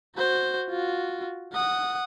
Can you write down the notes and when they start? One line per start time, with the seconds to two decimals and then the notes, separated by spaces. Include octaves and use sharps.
0.16 F#4 C5
0.70 F4 F#4
1.52 F#5 D#6